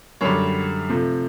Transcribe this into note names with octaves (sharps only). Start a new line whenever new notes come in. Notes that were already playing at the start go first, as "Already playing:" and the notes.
F#2 D3 G3 C#5
C3 F3 A3